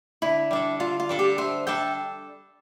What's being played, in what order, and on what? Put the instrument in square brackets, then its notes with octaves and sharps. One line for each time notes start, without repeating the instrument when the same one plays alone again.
[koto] D3 [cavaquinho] E4
[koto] G3 D4 A4
[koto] D3 [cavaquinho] F4
[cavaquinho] F4
[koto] G3 D4 A4
[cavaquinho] G4
[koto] D3 [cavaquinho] C5 E5
[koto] G3 D4 A4 [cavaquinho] E5 G5